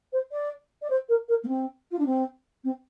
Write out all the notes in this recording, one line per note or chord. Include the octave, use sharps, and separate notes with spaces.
C5
D5
D5
C5
A#4
A#4
A#3
C4
F4
D4
C4
C4